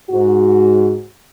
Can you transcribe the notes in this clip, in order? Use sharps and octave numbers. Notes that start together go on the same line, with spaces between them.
G#2 F#4